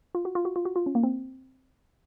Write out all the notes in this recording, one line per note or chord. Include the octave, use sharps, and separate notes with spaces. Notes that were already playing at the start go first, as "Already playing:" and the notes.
F4
F#4
F4
F#4
F4
F#4
F4
C#4
A#3
C4